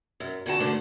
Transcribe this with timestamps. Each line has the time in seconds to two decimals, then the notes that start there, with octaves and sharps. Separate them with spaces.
0.20 F#2
0.46 D3 F#4 F#5 A5
0.60 G#2 D3 A3 D4 C5